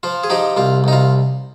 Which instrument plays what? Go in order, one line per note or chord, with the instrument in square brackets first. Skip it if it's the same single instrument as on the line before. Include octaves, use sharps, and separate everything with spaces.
[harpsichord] F3 F4
G#4
F3 D#4 G4
C2 F4
C2 D#4
F4